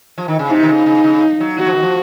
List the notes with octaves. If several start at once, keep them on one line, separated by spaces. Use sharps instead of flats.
F3
D#3
C#3
C3 D#4
D#3
C#3
C#3
C#3
F#3
F#3 F#4
F3
D#3
F3